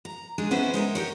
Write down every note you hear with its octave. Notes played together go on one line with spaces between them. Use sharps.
A#5
G#3 D4 D#4 G#4
D#3 B3 C#4 D4 E4 C5
G#3 D#4 A#4 E5
G4 A#4 C#5